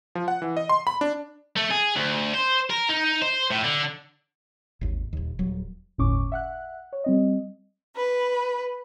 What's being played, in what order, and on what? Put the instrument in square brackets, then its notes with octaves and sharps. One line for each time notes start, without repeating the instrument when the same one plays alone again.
[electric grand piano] F3
F#5
E3
D#5
C6
B5
D4
[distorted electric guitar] A3
G#4
D2
C5
A#4
D#4
C5
A2
D3
[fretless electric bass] G#1 D#2
D#1 D#2
D#1 F#3
[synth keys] G1 D#2 A2 C#4 C#6 D6
E5 F#5 F#6
C#5
G3 C4 D#5
[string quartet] B4